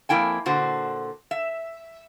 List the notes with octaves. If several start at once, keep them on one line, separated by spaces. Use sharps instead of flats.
F2 A#3 E4 G5 G#5
A#2 D3 F#4 C5
E5